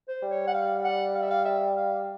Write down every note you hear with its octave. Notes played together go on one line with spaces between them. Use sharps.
C5
G3
C#5
F#5
F5
F#5
F5
E5
F5
E5
F5